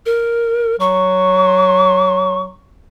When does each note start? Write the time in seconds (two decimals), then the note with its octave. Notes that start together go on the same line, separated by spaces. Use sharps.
0.06 A#4
0.80 F#3 C#6